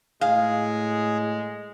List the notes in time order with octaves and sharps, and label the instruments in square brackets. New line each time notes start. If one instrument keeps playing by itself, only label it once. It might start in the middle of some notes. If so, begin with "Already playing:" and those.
[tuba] A2 [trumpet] G#3 [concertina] G#4 [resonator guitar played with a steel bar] F5